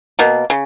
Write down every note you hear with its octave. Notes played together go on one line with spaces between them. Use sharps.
B2 A#3
C#3